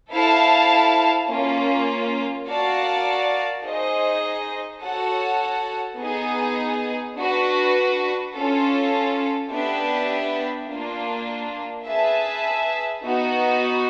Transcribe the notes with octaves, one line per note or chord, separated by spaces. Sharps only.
E4 A4 C5 F5 A5
A#3 C#4 F4
F#4 A#4 D5 F5 A5
D#4 G#4 C5 D#5
F#4 A4 C#5 F#5 A5
B3 D#4 G#4
D4 F#4 B4
C#4 F4 A4
B3 D4 G4 B4 E5
A#3 D4 F4
G#4 B4 E5 A5
B3 D#4 F#4